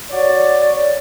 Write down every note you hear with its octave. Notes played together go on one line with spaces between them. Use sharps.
F#4 C#5 D5